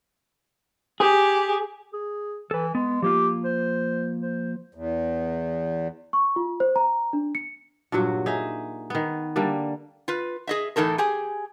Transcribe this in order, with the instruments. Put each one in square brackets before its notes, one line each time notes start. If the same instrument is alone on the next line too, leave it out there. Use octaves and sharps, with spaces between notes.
[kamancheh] G4 [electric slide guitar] G#4
[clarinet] G#4
[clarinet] E3 [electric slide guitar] A4 B4
[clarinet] G#3 [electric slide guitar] B3
[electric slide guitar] F3 A#3 F4 [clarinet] G4
[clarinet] C5
C5
[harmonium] E2
[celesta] C#6
F4
C5
A#5
D4
C#7
[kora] G2 A#2 F#3 F#4
D#4 G#4 E5
D#3 B3
D3 G3 A#3
[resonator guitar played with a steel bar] F4 B4
G#4 D#5 E5
A2 E3 D#4 A4 A#4
G4 G#4 G#5